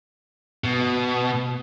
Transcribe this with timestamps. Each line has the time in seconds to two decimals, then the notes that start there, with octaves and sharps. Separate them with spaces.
0.64 B2